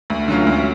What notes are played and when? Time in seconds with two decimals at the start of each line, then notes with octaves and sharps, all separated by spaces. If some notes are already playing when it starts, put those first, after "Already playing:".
0.10 D2
0.28 D3 F#3 C#4 F4
0.47 D2